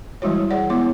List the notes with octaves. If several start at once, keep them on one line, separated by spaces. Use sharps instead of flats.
E3 G3 G#3 E4 F#4 C#5
G#4 C#5 D5 F#5
G#3 B3 E4 C#5 D6